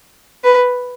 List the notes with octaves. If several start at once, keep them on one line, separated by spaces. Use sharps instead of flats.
B4